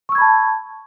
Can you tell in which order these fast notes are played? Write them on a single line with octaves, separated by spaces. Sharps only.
C#6 E6 G#6 B5 A5